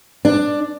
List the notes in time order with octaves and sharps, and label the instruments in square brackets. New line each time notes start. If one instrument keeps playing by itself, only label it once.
[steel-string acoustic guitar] D4